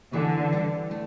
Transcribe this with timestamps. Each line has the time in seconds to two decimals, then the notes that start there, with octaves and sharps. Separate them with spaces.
0.13 D3 E3
0.53 G3
0.91 A3